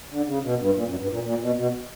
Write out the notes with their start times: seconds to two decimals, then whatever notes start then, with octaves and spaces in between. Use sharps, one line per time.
0.11 D3
0.27 C#3
0.43 B2
0.59 G2
0.76 A#2
0.87 F#2
1.00 G2
1.11 A#2
1.23 A#2
1.40 B2
1.56 B2